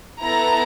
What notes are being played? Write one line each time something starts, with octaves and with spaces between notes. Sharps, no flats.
B3 E4 A4 A#5